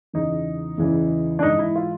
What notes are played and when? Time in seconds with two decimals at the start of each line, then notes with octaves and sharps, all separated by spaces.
0.13 E2 C#3 E3 D#4
0.78 E2 C#3 E3
1.39 D4
1.43 G#2 E3 D#4
1.59 E4
1.76 F4